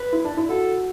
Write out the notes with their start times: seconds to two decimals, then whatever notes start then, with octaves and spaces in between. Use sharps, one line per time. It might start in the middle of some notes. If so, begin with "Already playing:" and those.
Already playing: B4
0.13 E4
0.25 D4
0.37 E4
0.49 F#4 A4